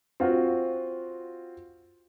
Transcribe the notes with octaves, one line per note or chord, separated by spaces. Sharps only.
C4 F4 F#4